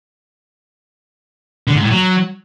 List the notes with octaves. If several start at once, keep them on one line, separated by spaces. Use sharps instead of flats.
D3
G#2
A2
F#3